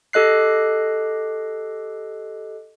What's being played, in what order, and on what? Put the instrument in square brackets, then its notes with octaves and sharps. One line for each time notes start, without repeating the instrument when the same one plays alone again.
[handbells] G4 A4 D#5 F#6 C7